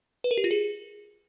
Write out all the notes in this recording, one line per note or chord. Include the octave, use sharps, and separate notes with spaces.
B4
A#4
G4
F4
G#4